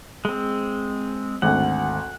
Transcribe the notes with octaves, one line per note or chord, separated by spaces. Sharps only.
G#3 C4
G#1 D2 F#5